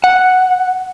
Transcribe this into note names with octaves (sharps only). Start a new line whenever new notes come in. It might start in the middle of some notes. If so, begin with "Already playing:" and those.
F#5